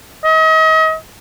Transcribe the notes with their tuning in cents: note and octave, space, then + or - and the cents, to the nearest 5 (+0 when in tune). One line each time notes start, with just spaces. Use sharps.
D#5 +40